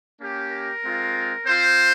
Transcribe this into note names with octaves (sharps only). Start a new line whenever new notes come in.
A#3 C#4 G4
A#4
G#3 C4 F4
C4 F4 C5